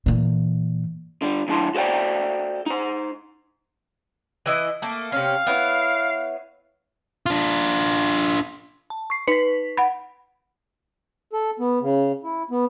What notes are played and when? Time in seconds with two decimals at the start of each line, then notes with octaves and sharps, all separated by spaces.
0.06 A#2 E3
1.22 D3 G3
1.48 D#3 F#3 D4 E4 A5 C6
1.75 F#4 A4 C5 D5 G5
2.66 D#4 C5
4.46 E3 E4 D#5
4.82 A3 A#3
5.12 C3 C#4 F5
5.47 B3 E4 C#5
7.26 D4 F4
8.90 A5
9.10 C#6 C7
9.28 D#4 B4 B6
9.77 F#5 B5
11.33 A4
11.60 B3
11.81 C#3
12.24 E4
12.51 B3